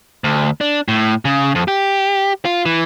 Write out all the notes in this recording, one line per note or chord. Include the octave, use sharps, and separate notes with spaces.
D2
D4
A2
C#3
F2
G4
F4
E3